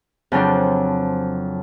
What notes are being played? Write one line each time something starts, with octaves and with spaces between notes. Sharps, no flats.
F2 C#3 F#3 D4 C5